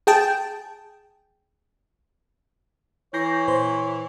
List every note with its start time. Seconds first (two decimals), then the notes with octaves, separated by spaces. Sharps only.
0.07 G#4 G5 A5
3.14 E3 C#5 G6 A#6 C7
3.48 A#2 C5 C6